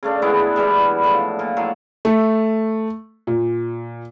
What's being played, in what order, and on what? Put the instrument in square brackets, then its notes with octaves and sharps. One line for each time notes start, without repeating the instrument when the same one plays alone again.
[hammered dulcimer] C#3 A3 D4
E3 G#3 B3 E4
B2 E3 G3 G#3
A2 F3
A#2
A2 F3 F#3
[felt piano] A3
A#2